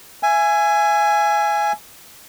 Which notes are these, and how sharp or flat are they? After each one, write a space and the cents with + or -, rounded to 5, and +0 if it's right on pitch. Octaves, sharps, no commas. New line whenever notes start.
E5 +30 G#5 +0